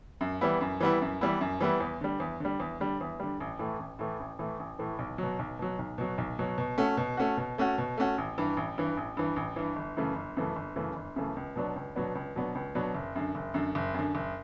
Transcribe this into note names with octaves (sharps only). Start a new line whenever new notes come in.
F#2
E3 G3 B3 E4
F#2
E3 G3 B3 E4
F#2
E3 G3 B3 E4
F#2
E3 G3 B3 E4
E2
D3 G3
E2
D3 G3
E2
D3 G3
E2
D3 G3
A1
A2 E3 A3
A1
A2 E3 A3
A1
A2 E3 A3
A1
A2 E3 A3
B1
B2 F#3
B1
B2 F#3
B1
B2 F#3
B1
B2 F#3
B2
A3 C#4 F#4
B2
A3 C#4 F#4
B2
A3 C#4 F#4
B2
A3 C#4 F#4
A1
G2 E3
A1
G2 E3
A1
G2 E3
A1
G2 E3
G1
F#2 C#3 E3 A3
G1
F#2 C#3 E3 A3
G1
F#2 C#3 E3 A3
G1
F#2 C#3 E3 A3
C#2
B2 F#3 B3 D4
C#2
B2 F#3 B3 D4
C#2
B2 F#3 B3 D4
C#2
B2 F#3 B3 D4
F#1
F#2 D3
F#1
F#2 D3
F#1
F#2 D3
F#1